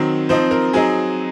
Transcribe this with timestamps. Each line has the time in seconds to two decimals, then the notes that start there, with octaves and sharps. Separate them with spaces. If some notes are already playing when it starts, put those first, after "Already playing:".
Already playing: D#3 F#3 C4
0.29 F3 C4 D#4 C5
0.51 A#4
0.73 F#3 C4 D#4 G#4